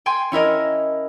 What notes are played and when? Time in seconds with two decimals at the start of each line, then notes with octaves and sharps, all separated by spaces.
0.06 G5 G#5 C6
0.32 C#4 E4 A#4 D#5